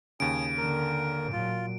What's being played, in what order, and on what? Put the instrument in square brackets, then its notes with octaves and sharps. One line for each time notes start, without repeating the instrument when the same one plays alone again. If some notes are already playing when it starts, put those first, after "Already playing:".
[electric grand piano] D#2 C#3 [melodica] G#5 D#6 [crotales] D7
[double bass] D3 A#3 [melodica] A#4
[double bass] A#2 F#3 [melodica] F4